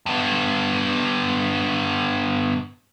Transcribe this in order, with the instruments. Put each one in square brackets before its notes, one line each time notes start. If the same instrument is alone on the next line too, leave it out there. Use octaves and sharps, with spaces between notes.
[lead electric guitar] G2 B3